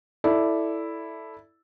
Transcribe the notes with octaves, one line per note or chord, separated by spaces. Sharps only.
E4 A4 D5